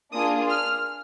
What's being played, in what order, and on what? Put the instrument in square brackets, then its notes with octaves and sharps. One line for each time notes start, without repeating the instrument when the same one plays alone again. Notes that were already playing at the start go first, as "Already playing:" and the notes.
[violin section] A#3 D4 F4 G#4 D#6
F6